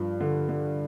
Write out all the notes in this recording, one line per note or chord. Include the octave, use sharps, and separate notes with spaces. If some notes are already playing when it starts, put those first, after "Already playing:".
Already playing: G2 F3
D3
D3